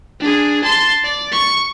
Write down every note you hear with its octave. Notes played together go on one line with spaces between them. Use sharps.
D4 G#4
A5 C6
D5
C#6